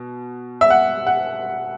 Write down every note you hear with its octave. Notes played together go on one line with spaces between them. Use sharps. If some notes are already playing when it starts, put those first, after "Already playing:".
Already playing: B2
E5
F#5
F#5